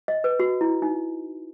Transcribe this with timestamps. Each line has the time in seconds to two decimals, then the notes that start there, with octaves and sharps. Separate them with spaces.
0.08 D#5
0.24 B4
0.40 F#4
0.61 E4
0.82 D#4